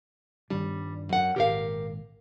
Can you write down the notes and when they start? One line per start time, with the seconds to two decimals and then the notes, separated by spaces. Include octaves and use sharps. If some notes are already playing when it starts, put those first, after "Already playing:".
0.50 G2 D#3 G3 D4
1.09 F#2 F#5
1.36 G#1 A#2 G4 A#4 F5